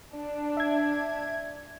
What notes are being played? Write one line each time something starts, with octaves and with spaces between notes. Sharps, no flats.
D4
E5 G#6